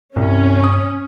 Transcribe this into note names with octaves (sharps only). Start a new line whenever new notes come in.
C2 G2 C#4
C#6 D#6